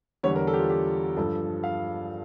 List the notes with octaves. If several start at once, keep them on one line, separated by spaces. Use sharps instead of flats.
E2 D3 G3 C#5
A#4
A4
G4
F4
G4
G2 F3 A4
F5